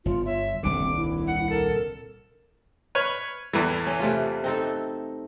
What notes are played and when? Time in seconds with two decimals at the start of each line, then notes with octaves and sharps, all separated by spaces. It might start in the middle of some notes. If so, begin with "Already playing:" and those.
0.05 G1 F4
0.26 C#5 E5
0.63 D#1 C2 D3 C4 D6
0.96 E4
1.27 F#5
1.50 A4 A#4
2.95 B4 C#5 F6
3.53 E2 G2 E3 A4
3.87 C#4
4.00 C3 A3 F4
4.44 C4 D#4 A4